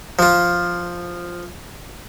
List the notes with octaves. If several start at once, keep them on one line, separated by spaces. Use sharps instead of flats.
F3 F4